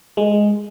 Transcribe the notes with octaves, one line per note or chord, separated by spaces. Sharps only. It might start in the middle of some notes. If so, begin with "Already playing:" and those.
G#3